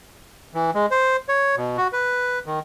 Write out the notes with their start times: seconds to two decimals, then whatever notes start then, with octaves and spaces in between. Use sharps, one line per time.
0.54 E3
0.75 G#3
0.91 C5
1.29 C#5
1.57 B2
1.77 F#4
1.93 B4
2.46 D#3